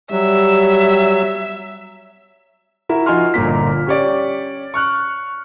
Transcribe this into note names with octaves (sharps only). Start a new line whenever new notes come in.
F#3 G3 E5
E4 F#4 A#4 E5
F3 D#4 F#4 G#5 C6 F6
G1 A#2 A#3 B6
C#4 G4 C#5 D5
C#6 F6 F#6